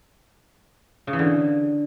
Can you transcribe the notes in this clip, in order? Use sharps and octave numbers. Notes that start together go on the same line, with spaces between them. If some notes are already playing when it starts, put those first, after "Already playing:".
C#3
E3
D3